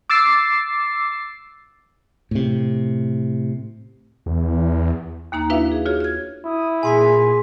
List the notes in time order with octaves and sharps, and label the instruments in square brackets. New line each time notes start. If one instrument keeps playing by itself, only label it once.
[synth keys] D6 E6 A6 C7
[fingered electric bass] A2 C3
[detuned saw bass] E2
[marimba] D#2 A#3 D#4 A#5
D4 E4 F#4 B4 E5 F5
G#4
F4 F#4 G#4 C#5
F6 G#6
[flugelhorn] E4 [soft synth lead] D#6
[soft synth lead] A#2 [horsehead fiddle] G#4 [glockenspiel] G#5 C6 B6